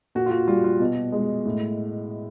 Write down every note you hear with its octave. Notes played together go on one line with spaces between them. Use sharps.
A#2 F#4
F4
F#4
G3 F4
F4
B2
G#3
A2